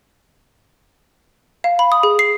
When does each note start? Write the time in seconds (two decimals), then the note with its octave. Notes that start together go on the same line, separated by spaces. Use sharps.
1.64 F5
1.79 B5
1.92 D#6
2.03 G#4
2.19 C7